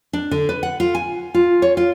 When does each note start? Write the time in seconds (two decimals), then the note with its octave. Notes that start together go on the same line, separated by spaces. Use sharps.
0.13 D4
0.31 D3
0.49 B4
0.63 F#5
0.80 F4
0.95 G#5
1.34 F4
1.62 C#5
1.77 F4